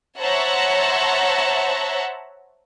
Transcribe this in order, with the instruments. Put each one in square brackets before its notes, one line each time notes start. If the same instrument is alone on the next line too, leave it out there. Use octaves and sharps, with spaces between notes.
[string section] C5 C#5 E5 F#5 A5 A#5